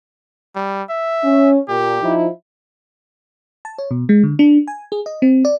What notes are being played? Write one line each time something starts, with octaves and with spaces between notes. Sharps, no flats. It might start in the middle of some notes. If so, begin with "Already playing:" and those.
G3
E5
C#4
A#2 G4
F3 D#4 E4
A5
C#5
B2
G#3
D3
D4
G#5
G#4
D#5
C4
D5